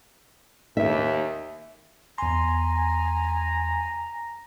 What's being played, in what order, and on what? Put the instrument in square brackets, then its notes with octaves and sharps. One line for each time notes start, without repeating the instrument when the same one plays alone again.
[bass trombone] D#2 [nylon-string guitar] E5
[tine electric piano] E2 C6 [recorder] G#5 [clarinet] A#5